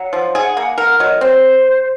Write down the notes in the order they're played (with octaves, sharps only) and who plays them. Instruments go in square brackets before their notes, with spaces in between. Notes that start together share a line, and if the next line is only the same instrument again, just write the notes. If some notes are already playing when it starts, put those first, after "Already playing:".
Already playing: [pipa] F#3 [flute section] F#5
[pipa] F3
G#4
A#3
A#4
[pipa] F#3 [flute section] D#5
[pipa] C4 [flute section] C5